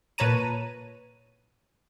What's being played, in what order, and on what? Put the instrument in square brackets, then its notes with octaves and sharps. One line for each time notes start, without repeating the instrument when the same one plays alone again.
[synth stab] A#2 B4 C#5 A5 A#5 D#7